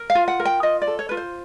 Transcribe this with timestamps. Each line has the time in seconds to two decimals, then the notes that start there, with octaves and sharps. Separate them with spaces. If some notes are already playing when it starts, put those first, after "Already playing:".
Already playing: A#4
0.10 F5
0.15 F4
0.28 F#5
0.40 A#4
0.45 G5
0.63 F4 D#5
0.82 D5
0.87 A4
0.99 C#5
1.09 F4 B4
1.17 C5